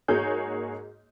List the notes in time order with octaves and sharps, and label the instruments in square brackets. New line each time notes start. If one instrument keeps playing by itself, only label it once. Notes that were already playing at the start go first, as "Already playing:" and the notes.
[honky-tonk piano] G#2 A#3 F#4 G#4 C#5 G6